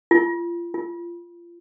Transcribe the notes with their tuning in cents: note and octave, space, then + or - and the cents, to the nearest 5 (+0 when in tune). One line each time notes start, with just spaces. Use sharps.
F4 -30
F4 -20